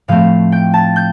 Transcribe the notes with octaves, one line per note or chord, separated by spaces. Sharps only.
A2 F3 A3 C4 F5
G5
A5
G6